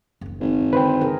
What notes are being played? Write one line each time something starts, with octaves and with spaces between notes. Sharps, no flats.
F#1 D#2
G#1
F#2 D3 D#3 B4 C5 G5
D#2 C#3 G#4 A#4